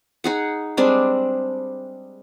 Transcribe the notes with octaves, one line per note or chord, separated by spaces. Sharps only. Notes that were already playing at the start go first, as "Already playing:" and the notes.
D#4 G#4 F#5
G3 G#3 C4 D4